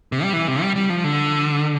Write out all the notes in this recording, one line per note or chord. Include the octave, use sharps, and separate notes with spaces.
C3
G3
E3
C3
G3
G3
F3
D3